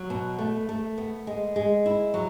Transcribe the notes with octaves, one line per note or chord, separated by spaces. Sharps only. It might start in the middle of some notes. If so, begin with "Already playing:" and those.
Already playing: F#3
B2
A3
A3
B3
G#3
G#3
E4
F#3